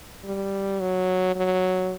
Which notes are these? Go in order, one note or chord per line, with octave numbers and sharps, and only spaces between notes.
G3
F#3
F#3